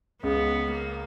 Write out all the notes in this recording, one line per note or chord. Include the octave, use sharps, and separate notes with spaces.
C#2 C#3 G#3 B3
A#3